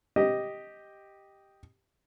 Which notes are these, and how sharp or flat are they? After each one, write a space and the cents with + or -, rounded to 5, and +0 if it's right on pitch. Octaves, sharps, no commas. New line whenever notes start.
G4 +0 D#5 +0